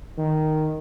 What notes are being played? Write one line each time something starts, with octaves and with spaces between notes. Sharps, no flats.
D#3